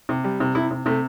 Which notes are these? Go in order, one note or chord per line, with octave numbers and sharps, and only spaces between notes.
C3
G3
C3
C3 E4
C3
C3 A3